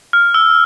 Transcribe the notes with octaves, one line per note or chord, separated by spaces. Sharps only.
F6
E6